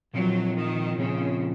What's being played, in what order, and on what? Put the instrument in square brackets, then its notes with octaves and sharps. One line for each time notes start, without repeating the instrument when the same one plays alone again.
[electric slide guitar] A#2 F3 C4 F4 [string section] F#3
[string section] D#3
[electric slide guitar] A#2 F3 C4 F4 [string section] C#3